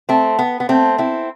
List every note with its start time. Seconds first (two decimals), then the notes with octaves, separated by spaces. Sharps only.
0.09 A3 C4
0.39 B3
0.60 B3
0.69 A3 C4
0.98 C4 E4